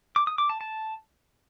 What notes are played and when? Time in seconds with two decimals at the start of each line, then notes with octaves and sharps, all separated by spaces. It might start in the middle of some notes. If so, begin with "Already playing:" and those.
0.16 D6
0.27 D#6
0.38 D6
0.49 A5
0.61 A5